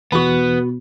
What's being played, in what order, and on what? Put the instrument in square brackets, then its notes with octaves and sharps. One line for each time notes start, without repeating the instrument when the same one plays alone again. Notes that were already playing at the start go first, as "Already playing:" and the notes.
[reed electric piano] E2 E3 [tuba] B2 [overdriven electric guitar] B3 [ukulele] F#4 B5